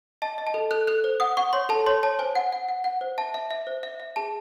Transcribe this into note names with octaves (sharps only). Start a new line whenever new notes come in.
D#5 A5
D#5
A5
A4
A4 F#6
A4 F#6
C5
F#5 D#6
F#5 C#6
C#5 C6
A4 A5
C#5 C6
C#5 A5
C5 G#5
F#5
F#5
F#5
F#5
C5
E5 A5
E5
E5
C5
E5
E5
G#4 A5